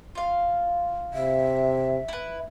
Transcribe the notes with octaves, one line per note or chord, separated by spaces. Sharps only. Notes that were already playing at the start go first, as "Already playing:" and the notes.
F4 F5
C3 E5
E4 B4